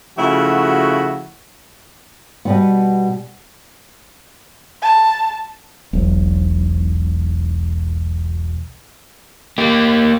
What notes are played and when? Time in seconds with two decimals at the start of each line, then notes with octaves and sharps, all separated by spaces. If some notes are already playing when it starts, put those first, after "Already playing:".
0.18 C#3 F3 A3 E4 F#4
2.45 B2 G3 B3
4.82 A5
5.93 E1 B1
9.58 A#3 G4